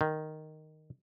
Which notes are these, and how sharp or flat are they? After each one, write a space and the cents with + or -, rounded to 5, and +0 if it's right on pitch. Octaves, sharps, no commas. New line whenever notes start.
D#3 -5